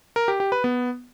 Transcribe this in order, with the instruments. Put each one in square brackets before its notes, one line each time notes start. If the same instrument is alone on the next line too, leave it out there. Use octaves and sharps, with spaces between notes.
[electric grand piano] A#4
G4
G4
B4
B3